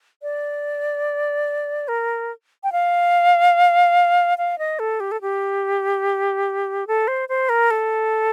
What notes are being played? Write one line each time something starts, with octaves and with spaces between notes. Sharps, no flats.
D5
A#4
G5
F5
F5
D#5
A4
G4
A4
G4
A4
C5
C5
A#4
A4